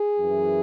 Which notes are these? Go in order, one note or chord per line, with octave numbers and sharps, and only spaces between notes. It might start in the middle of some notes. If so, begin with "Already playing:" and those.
Already playing: G#4
F#2 E3